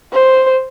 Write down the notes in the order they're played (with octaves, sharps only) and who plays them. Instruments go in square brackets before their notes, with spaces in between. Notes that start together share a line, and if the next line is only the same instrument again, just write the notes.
[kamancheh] C5